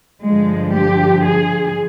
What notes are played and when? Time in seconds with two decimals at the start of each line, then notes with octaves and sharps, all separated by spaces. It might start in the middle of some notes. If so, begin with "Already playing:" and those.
0.23 G2 D3 F3 G#3
0.74 G4
1.25 G#4